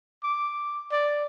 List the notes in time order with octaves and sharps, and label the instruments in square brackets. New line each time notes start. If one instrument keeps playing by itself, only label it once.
[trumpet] D6
D5